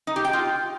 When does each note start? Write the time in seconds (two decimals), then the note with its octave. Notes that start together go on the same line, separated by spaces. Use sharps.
0.07 D#4
0.16 G4
0.25 G5
0.33 F4